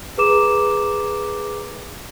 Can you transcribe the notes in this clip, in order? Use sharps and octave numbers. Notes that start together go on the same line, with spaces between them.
G#4 B4 A#5 D6 E7